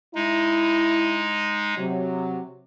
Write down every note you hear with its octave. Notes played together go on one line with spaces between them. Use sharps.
G#3 D#4 E4
C3 F#3